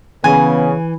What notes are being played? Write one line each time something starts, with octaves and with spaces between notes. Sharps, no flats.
C#3 E3 B3 G#5